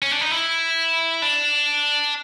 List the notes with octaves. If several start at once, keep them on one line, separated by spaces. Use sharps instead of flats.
C#4
D4
D#4
E4
D4